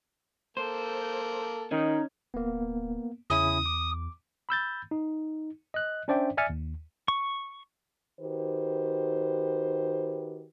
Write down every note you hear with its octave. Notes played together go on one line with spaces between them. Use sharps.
A#3 A4 C5
D#3 C#4 D#4
D1 A#3 B3
E2 C#3 C#4 E4 D#6
D6
B5 E6 G6 A6
D#4
D#5 F#6
C#4 D4 C5 D5 E5 G5
D5 E5 G#5 F6 A6 C#7
D#2
C#6
D#3 F#4 G4 B4 C5